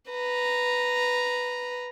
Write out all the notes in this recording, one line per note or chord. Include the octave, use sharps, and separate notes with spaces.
B4 A#5